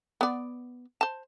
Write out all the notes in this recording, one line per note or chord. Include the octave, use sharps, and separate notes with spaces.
B3 D5
C5 A5